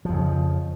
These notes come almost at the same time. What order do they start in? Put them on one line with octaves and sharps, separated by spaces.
F3 F2 C#3